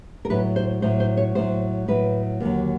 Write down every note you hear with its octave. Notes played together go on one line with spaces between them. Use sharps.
A#4
A2 F#3 B4
C5
A2 F#3 C5
C5
C#5
A2 F#3 C5
A2 F#3 B4
D#2 D3 F#3